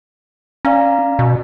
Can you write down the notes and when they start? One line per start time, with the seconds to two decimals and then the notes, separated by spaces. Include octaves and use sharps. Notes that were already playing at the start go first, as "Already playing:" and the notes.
0.65 C#4 D5 F5 A#5
1.19 B2